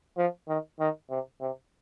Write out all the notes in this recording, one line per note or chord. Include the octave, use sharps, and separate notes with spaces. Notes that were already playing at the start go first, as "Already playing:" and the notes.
F3
D#3
D#3
C3
C3